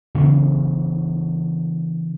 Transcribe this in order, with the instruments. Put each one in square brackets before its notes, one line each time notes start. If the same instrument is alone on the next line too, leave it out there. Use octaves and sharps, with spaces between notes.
[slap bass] C#3 E3 B3 D4